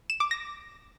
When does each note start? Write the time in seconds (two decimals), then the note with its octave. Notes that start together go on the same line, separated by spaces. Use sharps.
0.10 E7
0.20 D6
0.31 A#6